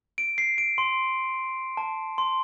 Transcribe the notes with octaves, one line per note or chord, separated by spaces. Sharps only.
D7
C7
D7
C6
A5
C6